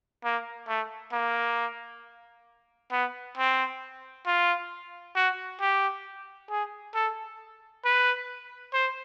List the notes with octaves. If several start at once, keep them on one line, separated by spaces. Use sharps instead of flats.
A#3
A3
A#3
B3
C4
F4
F#4
G4
G#4
A4
B4
C5